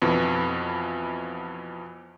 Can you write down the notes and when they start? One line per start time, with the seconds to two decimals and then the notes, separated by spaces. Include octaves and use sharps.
0.02 F2 B2 E3